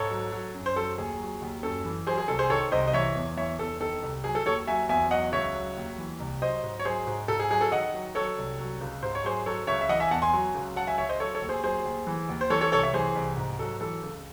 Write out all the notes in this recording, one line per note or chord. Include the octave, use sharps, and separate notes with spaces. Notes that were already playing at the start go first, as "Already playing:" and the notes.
Already playing: G#2 A4 C#5
F#3
F#3
F#2
C5
F#3 A4
D#2 G#4
F#3
D#2
F#2 A4
E3
F#3 G#4 C5
G#4
C2 A4
G#4 C5
D#3 A4 C#5
C2 C5 D#5
D#5
E3 C#5 E5
E2
E3 C#5 E5
E2 A4
D#3 A4
C2
F#3 G#4
A4
D#2 A4 C#5
F#3 E5 G#5
E2 E5 G#5
F#3 D#5 F#5
C#2 C#5 E5
F#3
D#2
E3
C2
F#3 C5 D#5
G#2
C#5
F#3 G#4 C5
G#2
G#2 A4
G#4
F#3 G#4
A4
D#3 D#5 F#5
F#3
F#3 A4 C#5
C2
F#3
C#2
G#2 C5
C#5
F#3 G#4 C5
F#3 A4 C#5
C#2 C#5 E5
E5
E3 D#5 F#5
E5 G#5
E2 F#5 A5
G#5 C6
F#3
C#2
F#3 F#5 A5
E5 G#5
C#2 C#5 E5
C5 D#5
F#3 A4 C#5
A4 C#5
D#2
G#4 C5
F#3 G#4 C5
D#2
E3
D#2
C5
E3 A4 C#5
A4 C#5
C2 A4 C#5
C#5 E5
E3 G#4 C5
C2
G#2
F#3 A4
E3 A4
C#2